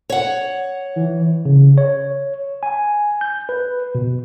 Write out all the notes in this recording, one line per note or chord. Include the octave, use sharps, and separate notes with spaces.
C#5 F#5
E3
C#3
C#5
G#5
G6
B4
B2